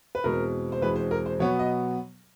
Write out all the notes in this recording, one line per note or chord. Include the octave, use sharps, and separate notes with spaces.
B4
E2 B2 G#3 C4 A#4
C5
E2 B2 G#3 C4 B4
C5
A#4
C5
B2 F#3 B3 C#5
D#5